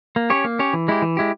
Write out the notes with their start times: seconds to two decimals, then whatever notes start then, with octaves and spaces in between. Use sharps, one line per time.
0.16 A#3
0.30 C#4 G4 C#5
0.44 A#3
0.59 C#4 G4 C#5
0.73 E3
0.88 G#3 E4 G4
1.02 E3
1.17 G#3 E4 G4